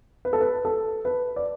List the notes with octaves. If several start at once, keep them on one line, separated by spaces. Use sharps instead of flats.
B4
A4
B4
A4
B4
D5